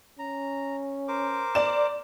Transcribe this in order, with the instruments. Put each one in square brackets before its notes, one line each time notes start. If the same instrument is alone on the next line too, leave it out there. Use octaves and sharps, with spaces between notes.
[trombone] C#4 [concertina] A#5
[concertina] A#4 C5 D6
[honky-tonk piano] D5 E7